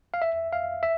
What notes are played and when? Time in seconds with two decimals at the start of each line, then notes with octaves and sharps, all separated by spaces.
0.14 F5
0.22 E5
0.53 F5
0.83 E5